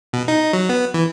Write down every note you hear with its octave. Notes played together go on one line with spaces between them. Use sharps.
B2
D#4
F#3
B3
E3